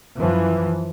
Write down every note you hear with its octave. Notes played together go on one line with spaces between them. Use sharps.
F#2 E3 F3